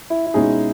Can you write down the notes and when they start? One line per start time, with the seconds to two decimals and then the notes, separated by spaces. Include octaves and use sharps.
0.10 E4
0.26 E4
0.34 B2 G#3 C#4 D#4 G#4